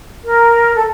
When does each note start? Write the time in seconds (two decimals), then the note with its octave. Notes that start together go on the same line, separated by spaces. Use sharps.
0.26 A#4
0.76 A4